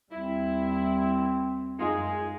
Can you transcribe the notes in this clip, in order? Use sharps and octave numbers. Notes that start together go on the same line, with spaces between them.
D#2 G3 C4 E4
F#2 G#3 D#4 F4 G#4